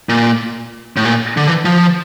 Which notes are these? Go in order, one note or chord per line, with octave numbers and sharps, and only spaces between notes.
A#2
A2
A#2
D3
E3
F3